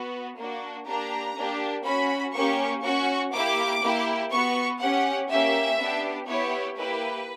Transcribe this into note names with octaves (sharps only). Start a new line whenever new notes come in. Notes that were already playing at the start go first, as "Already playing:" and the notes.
Already playing: B3 F#4
A#3 D4 F#4
A#3 D4 G4 A#5
A#3 D4 G4
C#4 F#4 B5
A#3 C#4 G4 C#6
C#4 F#4 C#6
A#3 E4 G4 D6
A#3 E4 G4
B3 F#4 C#6
C#4 G4 F#5
A#3 C#4 G4 E5
B3 D4 G4
B3 E4 G4 C#5
A#3 E4 G4 B4